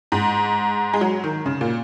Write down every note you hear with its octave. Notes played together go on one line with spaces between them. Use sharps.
G#2
G#3
F#3
D#3
C#3
A#2